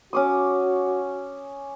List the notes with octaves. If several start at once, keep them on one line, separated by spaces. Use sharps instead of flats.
C#4 F#4 D6 D#6